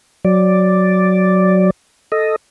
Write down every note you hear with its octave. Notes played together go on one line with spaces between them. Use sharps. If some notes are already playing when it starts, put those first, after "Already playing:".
F#3 D5
A4 D#5